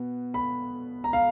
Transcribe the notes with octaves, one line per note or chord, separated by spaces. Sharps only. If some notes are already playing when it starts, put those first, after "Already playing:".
Already playing: B2 B3
B5
A#5
F5